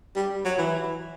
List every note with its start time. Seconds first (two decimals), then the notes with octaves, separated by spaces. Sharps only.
0.16 G3
0.45 F#3
0.58 E3